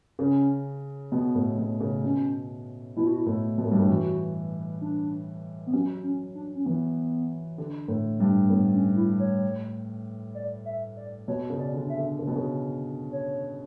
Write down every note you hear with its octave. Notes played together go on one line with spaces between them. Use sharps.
C#3 C#4
B2 B3
A2
B2
C#3
B2 C#4
B2 E4
F#4
E4
A2
B2
A2
G2
A2
E3 F#4
D4
B3
F#3 C#4
C#4
D4
C#4
E3 B3
D3
A2
G2
A2 B3
C#4
E4
C#5
D5
E5
D5
B2 C#5
C#3
D5
D3
E5
D3
C#3
B2
C#3
C#5